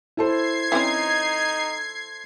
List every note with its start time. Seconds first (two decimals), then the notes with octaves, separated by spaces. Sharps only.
0.17 E4 A4 C5 G#6 C7
0.72 E3 C4 C#4 D#4